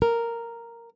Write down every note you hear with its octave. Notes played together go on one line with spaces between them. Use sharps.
A#4